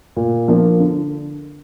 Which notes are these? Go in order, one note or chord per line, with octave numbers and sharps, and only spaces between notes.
A#2
F3 A#3 D4 F4
D3